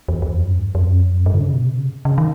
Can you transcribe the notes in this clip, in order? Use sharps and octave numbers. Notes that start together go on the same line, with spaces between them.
E2
E2
F2
G2
F2
F#2
F2
F#2
G2
D3
C#3
B2
C3
C#3
C#3
D#3